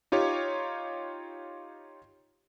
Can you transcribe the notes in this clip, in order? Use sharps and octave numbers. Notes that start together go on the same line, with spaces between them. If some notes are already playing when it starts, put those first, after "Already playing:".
D#4 F4 G4 C#5